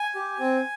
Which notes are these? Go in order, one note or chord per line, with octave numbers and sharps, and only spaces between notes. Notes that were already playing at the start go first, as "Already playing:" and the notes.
Already playing: G#5
G4
C4